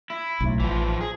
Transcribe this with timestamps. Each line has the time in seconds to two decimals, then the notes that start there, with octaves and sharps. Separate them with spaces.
0.10 E4
0.40 B1 A2
0.60 A1 E3 F3
1.01 G#4